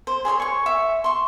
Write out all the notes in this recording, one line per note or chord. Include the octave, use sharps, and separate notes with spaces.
C5
G#4 C#5 D#5 C6
C#5 C#6
E5
C6 C#6